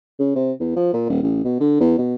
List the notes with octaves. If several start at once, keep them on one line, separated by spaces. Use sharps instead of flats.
C#3
C3
E2
F3
A#2
D#1
A1
B2
D3
E2
B2